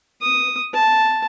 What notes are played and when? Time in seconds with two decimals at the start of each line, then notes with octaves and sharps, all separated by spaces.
0.21 D#6
0.74 A5